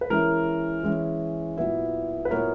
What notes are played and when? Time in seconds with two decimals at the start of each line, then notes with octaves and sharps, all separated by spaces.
0.01 B4
0.10 E3 G#3 C#4 E4 A#4
0.83 E3 G#3 C#4 E4
1.57 A#2 F#3 B3 E4
2.25 B4
2.31 A#2 F#3 B3 E4 A#4 C#5